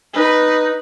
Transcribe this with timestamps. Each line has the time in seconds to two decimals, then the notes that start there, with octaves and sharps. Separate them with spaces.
0.14 D#4 B4